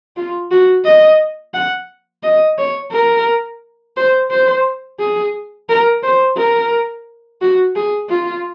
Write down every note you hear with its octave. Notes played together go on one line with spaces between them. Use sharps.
F4
F#4
D#5
F#5
D#5
C#5
A#4
C5
C5
G#4
A#4
C5
A#4
F#4
G#4
F4